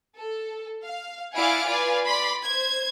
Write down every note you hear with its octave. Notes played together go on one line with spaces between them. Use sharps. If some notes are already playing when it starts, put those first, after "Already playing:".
A4
F5
E4 D5 F5 F#5 G#5 D7
F4 B4 D5 F5 G#5
D5 B5 C6
C5 G#6